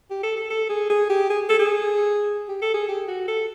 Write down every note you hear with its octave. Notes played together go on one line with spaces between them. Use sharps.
G4
A4
A4
A4
G#4
G#4
G4
G#4
A4
G#4
G4
A4
G#4
G4
F#4
A4